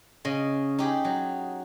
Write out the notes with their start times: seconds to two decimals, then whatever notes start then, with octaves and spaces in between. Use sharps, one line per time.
0.25 C#3 D#5
0.78 D#4 G4 G#4 B5
1.05 F#3